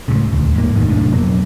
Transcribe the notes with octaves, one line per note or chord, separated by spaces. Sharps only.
C#2 A2 C#3
D#1 D2
A1 G#2 A#3
F1 D2 G#2 D#3
F1 B1 A2 D4
F2 B2 F#3 A#3